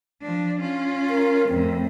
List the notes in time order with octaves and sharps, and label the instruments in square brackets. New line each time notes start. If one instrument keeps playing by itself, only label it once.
[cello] F3 D4
C#4 F4
[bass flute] A#4
[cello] F2 A2 [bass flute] C4